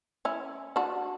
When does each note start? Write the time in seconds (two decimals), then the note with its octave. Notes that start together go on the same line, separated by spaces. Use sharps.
0.25 C#4 E4
0.76 D4 F#4